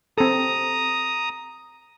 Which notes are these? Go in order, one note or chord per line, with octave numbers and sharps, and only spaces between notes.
C4 A4 A#5 D#6